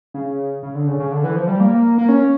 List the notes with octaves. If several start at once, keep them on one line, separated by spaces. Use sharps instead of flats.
C#3
C#3
D3
C#3
C#3
D3
E3
F3
G3
A#3
A#3
C#4